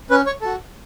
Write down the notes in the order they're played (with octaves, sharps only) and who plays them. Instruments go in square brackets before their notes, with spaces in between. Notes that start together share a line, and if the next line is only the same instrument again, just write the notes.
[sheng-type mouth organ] C#4 B4
C#5
F#4 A4